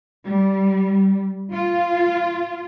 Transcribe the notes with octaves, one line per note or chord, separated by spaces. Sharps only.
G3
F4